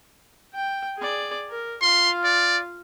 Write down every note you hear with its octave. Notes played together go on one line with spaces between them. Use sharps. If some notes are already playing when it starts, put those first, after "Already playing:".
G5
G#4 D5
A#4
F4 F5 C6
D5